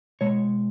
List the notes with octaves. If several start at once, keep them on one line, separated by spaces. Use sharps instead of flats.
B2 G#3 C#5